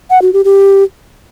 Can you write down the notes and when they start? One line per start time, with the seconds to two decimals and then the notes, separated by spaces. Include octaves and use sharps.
0.10 F#5
0.22 F#4
0.33 G4
0.45 G4